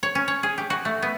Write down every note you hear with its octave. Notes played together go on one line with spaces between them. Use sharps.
C#5
C#4
C#5
G#4
G4
F#4
A3
B3